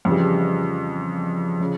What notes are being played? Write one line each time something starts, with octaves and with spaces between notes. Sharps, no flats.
F2 C#3 E3 G3
C#3 F3